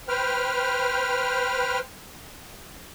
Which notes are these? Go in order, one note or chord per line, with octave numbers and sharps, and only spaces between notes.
B4 C5 G5 F6